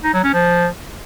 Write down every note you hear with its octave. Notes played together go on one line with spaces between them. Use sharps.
D#4
F#3
C#4
F3